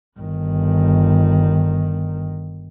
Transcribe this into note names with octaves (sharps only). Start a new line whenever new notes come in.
G1 D#3